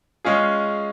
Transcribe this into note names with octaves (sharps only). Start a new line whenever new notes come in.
G#3 C#4 F4 G#4